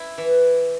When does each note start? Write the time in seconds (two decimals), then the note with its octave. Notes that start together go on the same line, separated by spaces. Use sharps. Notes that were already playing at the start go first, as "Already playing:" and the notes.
Already playing: E4
0.18 E3